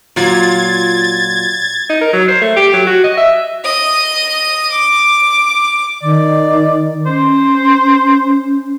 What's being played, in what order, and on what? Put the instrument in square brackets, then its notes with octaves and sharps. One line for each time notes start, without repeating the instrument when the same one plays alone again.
[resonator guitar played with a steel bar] A#2 F#3 F4 [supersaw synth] G#6 A6
[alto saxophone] D#4
A#4
F#3
C5
A3
G4
F#3
F#4
D#5
E5
[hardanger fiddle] D#5 D#6
D6
[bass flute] D#3 [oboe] D5
[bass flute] C#4 [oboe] C5